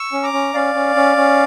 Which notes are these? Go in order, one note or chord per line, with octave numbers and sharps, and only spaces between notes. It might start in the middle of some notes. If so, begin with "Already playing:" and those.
Already playing: C#6 E6
C#4
A#5 D6
C#4
C#4 D5 F5
C#4
C#4
C#4